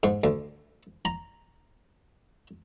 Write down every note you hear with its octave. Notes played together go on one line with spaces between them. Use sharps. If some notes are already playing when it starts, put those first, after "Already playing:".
G#2
D2
A#5